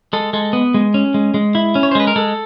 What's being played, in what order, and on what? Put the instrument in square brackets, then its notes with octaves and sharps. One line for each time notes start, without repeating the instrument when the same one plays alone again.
[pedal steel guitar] G#3 A4
G#3 A4
B3
G#3
C#4
G#3
G#3
E4
C#4
C#5
C5
G#3 B4
A#4
G#3 A4